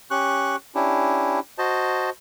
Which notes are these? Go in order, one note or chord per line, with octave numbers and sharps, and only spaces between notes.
C#4 G4 C#6 F#6
C#4 D4 E4 G4
F#4 C5 D#5 A5